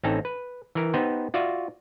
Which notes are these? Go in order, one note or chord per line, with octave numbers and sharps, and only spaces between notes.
A1 C4 C#4 D#4 A4 A#5
B4
E3 A#4
B3 D#4 G4 B4 C5
F4 F#4 D5 E5 F5